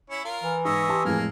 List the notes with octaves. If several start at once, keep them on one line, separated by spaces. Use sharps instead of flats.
C#4 E4
F4 A#4
E3
G#2 C#5 D#5 E5
G4 A5 C6
F2 A2 G#3 A#3 G#5 F6